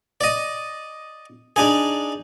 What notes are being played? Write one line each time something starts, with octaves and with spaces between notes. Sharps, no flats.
D5 D#5
D4 D#4 G#4